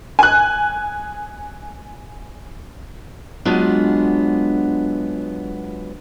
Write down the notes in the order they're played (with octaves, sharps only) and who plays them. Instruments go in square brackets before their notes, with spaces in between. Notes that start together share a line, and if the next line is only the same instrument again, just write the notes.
[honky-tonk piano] G#5 F#6
[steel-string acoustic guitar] F#3 G#3 B3 D4 F4